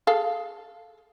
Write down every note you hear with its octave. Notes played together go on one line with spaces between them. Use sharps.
G#4 A4 F5